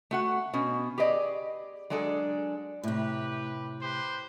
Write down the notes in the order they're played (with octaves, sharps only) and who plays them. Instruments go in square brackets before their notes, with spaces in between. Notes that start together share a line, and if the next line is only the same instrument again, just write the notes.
[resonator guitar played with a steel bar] A3 F#4 F#5
B2 C#4
G4 G#4 B4 D5 D#5
F#3 G#3 D4 G#4 A4
[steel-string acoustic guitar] A2 C3 [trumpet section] G4 B4
[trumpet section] G4 B4 C5